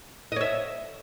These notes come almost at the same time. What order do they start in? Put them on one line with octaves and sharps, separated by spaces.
D#5 C#5 E5